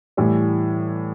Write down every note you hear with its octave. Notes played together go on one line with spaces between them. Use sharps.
A2 E3 G3